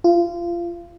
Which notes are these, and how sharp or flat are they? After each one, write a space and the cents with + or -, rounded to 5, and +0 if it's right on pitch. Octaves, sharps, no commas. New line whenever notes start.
F4 -25